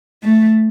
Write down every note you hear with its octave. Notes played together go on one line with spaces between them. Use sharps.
A3